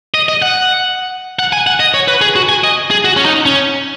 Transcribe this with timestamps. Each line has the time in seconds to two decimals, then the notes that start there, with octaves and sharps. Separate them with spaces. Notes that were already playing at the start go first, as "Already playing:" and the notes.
0.14 D#5
0.29 D#5
0.42 F#5
1.39 F#5
1.53 G#5
1.67 F#5
1.80 D#5
1.94 C#5
2.08 B4
2.21 G#4
2.36 F#4
2.49 G#5
2.64 D#5
2.91 G#4
3.05 F#4
3.17 C#4
3.25 D#4
3.46 C#4